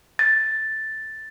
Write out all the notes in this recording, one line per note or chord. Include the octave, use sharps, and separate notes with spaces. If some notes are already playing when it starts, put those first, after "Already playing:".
A6